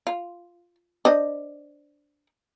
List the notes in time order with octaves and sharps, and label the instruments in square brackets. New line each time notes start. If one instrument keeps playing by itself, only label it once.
[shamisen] F4
D4 C5 D#5